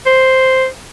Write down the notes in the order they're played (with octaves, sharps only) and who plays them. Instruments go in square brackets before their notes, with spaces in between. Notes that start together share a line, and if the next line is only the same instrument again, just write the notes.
[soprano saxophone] C5